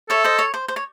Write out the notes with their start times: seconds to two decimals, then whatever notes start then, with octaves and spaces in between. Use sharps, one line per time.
0.09 A4 C#5 E5
0.24 C5 D#5
0.39 C#5
0.54 C5
0.68 C5
0.76 C#5